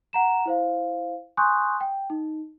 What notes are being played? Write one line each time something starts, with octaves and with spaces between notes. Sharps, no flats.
F#5 A#5 E7
E4 C5 F5
G#5 C6 C#6 D#6 F#6 G6
G5
D#4